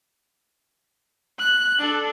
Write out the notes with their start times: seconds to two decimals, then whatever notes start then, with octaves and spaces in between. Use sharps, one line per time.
1.39 F#6 F#7
1.79 D4 A4